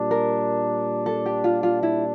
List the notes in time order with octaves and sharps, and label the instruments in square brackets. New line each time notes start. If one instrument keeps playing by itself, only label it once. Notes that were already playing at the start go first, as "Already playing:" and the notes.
Already playing: [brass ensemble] A#2 G3 D4
[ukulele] A#4
A4
G4
F4
F4
E4